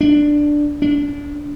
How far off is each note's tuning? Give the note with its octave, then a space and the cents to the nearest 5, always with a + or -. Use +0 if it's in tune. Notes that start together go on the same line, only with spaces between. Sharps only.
D4 +5
D4 -25